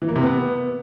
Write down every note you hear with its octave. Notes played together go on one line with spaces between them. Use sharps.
E3
A#3
C3
B3